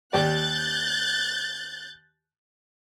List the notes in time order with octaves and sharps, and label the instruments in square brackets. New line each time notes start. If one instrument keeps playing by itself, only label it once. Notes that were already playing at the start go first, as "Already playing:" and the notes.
[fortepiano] D#2 G4 D5 [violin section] F#6 G6 A6